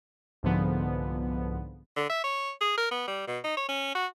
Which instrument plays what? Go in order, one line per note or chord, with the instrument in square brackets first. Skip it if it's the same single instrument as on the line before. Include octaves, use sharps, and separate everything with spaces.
[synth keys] C2 G#2 D3 F3 B3
[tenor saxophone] D3
E5
C#5
G#4
A#4
B3
G3
B2
D#4
C#5
C#4
F#4